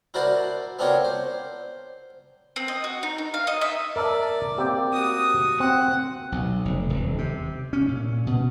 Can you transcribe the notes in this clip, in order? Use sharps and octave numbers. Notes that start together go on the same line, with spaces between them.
E4 F#4 A#4 C5 D5 A5
B3 C4 D4 F4 A#4 C#5
C5
C4
D#5
F#4
D#4
D#4
F5
D#5
E5
A#4 D5 E5 A5
A#3 C4 G4
F#4 D#6
C4 F#5
B1
F1
D#1
C3
C#4
A#2
B2